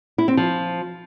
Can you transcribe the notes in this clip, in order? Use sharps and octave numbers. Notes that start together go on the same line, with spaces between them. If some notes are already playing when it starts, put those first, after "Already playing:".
E4
C4
F3